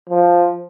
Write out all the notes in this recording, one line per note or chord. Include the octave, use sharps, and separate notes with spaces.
F3